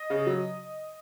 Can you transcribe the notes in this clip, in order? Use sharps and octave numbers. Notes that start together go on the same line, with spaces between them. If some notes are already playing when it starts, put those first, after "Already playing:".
Already playing: D#5
C#3
F#3